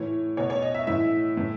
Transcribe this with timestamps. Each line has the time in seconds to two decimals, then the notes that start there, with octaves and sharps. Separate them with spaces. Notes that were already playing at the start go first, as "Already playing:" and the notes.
Already playing: A2 E3 C#5
0.37 B2 C#5
0.50 C#5
0.62 D#5
0.75 E5
0.87 A2 E3 E5
1.37 A2 E3